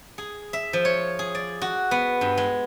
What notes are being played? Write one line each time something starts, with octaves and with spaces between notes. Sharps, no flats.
G#4
E5
F3
C#5
G#4
D5
F#4
B3
G2
G#3